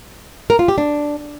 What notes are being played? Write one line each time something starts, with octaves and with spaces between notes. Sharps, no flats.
A#4
F4
G4
D4